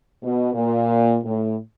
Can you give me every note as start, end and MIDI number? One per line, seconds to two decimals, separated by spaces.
0.23 0.52 47
0.54 1.17 46
1.24 1.56 45